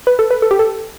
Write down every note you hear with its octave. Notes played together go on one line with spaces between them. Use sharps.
B4
A4
B4
A4
G4
A4